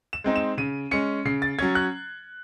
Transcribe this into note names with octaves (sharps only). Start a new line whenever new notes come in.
E7
G#3 C4 D#4
E7
C#3 D#7
G#3 C#4 C#7
C#3 C7
A6
F#3 C#4 G#6
F#6